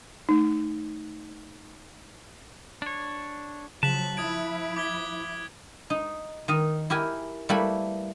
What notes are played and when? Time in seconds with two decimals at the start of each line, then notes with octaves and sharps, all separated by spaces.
0.29 A3 D#4
2.82 D4 C#5
3.83 C#3 F3 F#3 A5 F#6 B6 F#7
4.17 F3 E4 D#6 G#6 D7
4.76 D6 G#6 G7
5.90 D#4
6.48 D#3 D#4 D#5
6.90 E4 G4 A#4 G#5
7.49 G3 A3 A#3 E4 B4 B5